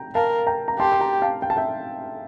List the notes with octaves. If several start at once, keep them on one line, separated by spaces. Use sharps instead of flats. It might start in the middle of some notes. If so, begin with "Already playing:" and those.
Already playing: G5 A#5
A#4 F5 A5
G5 A#5
A#5
G4 A5 C6
C6
G5 A#5
F5 A5
G5
A5
E5 G5